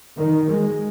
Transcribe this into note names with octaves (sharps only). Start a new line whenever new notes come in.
D#3
G#3